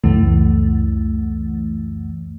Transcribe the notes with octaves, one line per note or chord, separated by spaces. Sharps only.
C#2 F#2 E3 A3